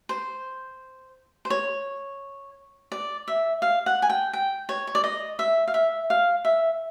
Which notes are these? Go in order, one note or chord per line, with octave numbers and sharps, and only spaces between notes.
C5
C5
C#5
D5
E5
F5
F#5
G#5
G5
G5
C#5
C#5
D5
D#5
E5
F5
E5
F5
E5